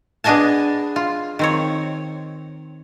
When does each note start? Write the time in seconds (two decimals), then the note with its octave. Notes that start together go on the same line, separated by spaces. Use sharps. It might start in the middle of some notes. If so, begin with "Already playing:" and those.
0.24 B3 D4 G#4 D#5 G#5 A5
0.96 F4
1.39 D#3 C4 C#5